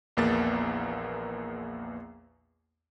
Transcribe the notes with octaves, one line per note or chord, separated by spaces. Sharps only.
A#1 E2 A#3 B3 A6